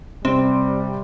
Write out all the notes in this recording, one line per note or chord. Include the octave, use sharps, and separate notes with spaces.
C3 G3 C4